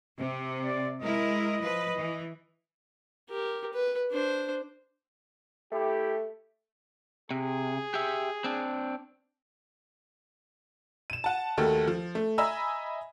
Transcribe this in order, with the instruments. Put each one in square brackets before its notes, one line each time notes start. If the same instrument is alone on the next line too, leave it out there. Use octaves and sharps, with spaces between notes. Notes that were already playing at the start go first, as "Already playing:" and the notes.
[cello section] C3
[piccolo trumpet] D5
[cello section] G#3 E4 A#4 [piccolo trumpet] D#5
[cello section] F3 B4
E3
[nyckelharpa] G4 A#4
B4
D4 C5
[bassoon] A3 [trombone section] E4 G4
[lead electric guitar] C3 [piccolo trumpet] G#4
[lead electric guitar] G4 E5
C4 D4
[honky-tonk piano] D#7 E7
F#5 A5
D#2 D#3 A3 F#4 A4
F3
A3
D#5 E5 G#5 A#5 B5 E6